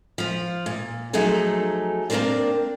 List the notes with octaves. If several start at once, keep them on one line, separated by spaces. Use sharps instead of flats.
F3 F4
A#2
F3 F#3 A3 D#4 G#4 A4
A#3 C4 D4 A#4 C5 D5